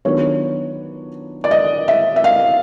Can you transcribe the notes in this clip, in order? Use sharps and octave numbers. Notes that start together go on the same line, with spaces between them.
D#3 F#3 B3 D4 F4 C#5
D5
D#5
E5
E5
F5